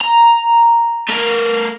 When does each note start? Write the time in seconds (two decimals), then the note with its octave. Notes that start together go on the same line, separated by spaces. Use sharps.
0.01 A#5
1.09 A3 A#4